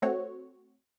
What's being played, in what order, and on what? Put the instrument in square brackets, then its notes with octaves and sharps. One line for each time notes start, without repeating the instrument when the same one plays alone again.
[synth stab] A3 C4 F#4 C#5